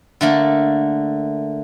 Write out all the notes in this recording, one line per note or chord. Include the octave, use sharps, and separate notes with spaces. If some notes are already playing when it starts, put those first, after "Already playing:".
D3 A3 A#3